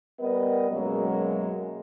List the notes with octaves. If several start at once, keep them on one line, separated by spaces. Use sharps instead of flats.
G3 B3 A#4 B4 D#5
F#2 B2 F#3 G#3 A#3